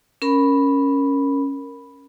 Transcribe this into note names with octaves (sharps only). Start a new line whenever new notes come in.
C#4 A#4 B5